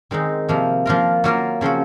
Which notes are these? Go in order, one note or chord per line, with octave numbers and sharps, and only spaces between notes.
D#3 G#3 C4 D#4
C3 F3 A#3
F3 A#3 F4 A#4
F#3 A#3 F4 A#4
C#3 F3 C4 F#4